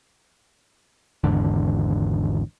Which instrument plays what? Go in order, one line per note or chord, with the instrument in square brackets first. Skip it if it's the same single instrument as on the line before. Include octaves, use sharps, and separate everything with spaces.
[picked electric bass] G#1 E2 G#2 D3